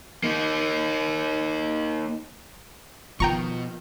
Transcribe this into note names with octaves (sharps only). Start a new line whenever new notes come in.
A#3 D#4
B2 D#3 F3 B3 F4 G5 A#5 C#6